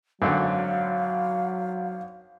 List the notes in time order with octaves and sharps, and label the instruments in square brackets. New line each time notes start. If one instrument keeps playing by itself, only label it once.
[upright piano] G#1 [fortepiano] F#2 D3 [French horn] F#3 [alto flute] F5